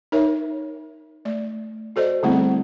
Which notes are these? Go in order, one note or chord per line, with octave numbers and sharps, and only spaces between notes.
D#4 A#4 C#5 E5
A3 D5
F#4 A4 C5 D5 D#5
D3 G3 A3 B3 C4 E4